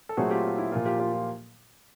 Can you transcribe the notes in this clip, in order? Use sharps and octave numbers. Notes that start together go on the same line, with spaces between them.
A4
A#2 F#3 A3 C4 F#4 G#4
F4 G4
F4
E4
A#2 F3 A#3 F4
F4 G4
F4 G4
F4